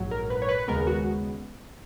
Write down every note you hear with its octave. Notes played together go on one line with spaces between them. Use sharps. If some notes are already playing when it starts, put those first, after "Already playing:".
Already playing: A#1 G#2 F#3
A#4
B4
C#5
B4
D#2 C#3 G#3 B3 A#4
F#4